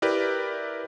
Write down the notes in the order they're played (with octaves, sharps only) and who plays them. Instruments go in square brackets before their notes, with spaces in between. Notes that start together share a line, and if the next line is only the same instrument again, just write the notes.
[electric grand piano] E4 G4 A#4 B4 D5